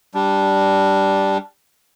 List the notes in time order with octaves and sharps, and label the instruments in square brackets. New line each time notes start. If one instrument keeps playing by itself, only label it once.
[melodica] G3 D4